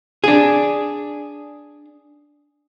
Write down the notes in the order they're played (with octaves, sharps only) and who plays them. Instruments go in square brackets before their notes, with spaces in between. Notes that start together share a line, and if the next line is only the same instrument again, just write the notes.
[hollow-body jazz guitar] D4 G#4